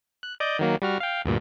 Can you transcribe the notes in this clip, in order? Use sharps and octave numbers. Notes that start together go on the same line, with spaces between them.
F#6
D5 D#5 G6
D#3 F#3 A#3
G3 F#4 F6
F5 G5
D2 G2 A#2